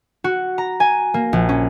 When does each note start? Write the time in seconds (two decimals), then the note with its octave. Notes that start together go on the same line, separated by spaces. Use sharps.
0.24 F#4
0.58 A#5
0.80 G#5
1.14 A#3
1.33 A#1
1.49 C#4